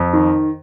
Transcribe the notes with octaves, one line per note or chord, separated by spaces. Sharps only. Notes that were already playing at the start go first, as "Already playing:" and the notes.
Already playing: F2
D#3